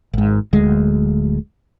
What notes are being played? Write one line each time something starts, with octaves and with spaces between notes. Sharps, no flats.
G#1 G#2
D1 D2 G#3